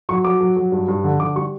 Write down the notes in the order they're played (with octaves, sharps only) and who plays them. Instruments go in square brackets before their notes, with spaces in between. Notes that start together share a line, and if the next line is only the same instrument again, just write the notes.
[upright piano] F#3 C#6
F#3 D6
F#3
F#3
G2
G2
D3
D3 D6
G3 C#6